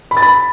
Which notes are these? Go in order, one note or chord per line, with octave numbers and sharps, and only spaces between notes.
B5
A6
B5